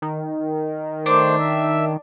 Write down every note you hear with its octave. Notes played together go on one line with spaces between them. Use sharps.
D#3
A3 D4 C5
E5